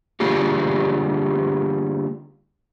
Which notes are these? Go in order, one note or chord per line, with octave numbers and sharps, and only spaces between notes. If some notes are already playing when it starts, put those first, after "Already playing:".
D3 G3 A#3 F4 G4 G#4